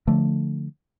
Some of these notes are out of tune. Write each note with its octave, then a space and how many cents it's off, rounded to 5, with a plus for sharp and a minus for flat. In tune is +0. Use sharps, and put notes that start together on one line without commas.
D3 +0 F3 +0 A3 +0